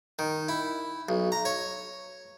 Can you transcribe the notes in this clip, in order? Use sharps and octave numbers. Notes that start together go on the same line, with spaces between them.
D#3
E4
B1
A#5
C#5